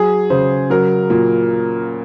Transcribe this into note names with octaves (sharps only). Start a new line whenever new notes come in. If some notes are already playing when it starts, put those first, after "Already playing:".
Already playing: F#3 G#4
C#3 C5
F#3 A#4
A#2